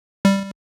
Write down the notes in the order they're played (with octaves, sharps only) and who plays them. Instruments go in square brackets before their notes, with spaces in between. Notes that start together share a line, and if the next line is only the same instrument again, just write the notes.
[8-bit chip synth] G3